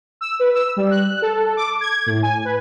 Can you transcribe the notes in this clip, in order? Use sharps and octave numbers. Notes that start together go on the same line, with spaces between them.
E6
B4
E6
G3
F#6
A4
D6
G#6
A2
G#5
B4